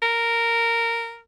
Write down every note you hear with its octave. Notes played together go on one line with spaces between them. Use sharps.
A#4